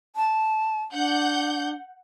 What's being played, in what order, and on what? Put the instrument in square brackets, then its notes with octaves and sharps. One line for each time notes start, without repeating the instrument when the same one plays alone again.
[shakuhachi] A5
[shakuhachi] D4 [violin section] F#5 G6